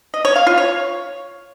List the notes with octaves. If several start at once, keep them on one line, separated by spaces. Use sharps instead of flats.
D#5
C#5
F5
F4
C#5